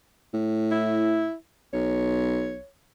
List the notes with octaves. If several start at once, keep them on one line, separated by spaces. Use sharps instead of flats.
A2
E4
B1 C#5